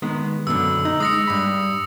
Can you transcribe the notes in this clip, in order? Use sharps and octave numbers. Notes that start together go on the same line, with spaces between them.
D#3 G#3 B3
F#2 B2 D3 E6
D#4
G#3 D#6 A#6 C#7
G2 B5